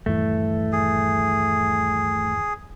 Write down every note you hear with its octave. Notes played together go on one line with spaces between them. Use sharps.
D#1 G2 E3 A3
G#4